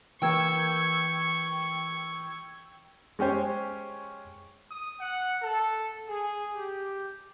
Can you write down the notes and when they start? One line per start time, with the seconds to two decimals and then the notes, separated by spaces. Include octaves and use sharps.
0.22 E3 A#3 A#4 G5 C#6 E6 G#6
3.19 G#3 C#4 G4 C5 C#5
4.71 D#6
5.00 F#5
5.43 A4
6.08 G#4
6.55 G4